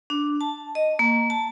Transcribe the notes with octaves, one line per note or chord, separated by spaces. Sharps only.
D4
A5
D#5
A#3
A5